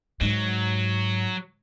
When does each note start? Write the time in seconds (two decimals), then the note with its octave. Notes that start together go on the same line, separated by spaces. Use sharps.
0.21 G#2 F#3